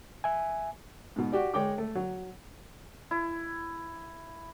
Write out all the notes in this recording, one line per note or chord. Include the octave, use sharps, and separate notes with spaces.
E5 G#5
G#2 B2
F#4 G4 D5
G#3 C#5 G5 D6
A3
F#3
E4